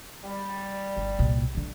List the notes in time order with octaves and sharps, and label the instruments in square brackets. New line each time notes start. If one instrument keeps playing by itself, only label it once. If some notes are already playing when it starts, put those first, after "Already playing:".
[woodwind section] G3
[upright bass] G1
C2 A#2
D3 G3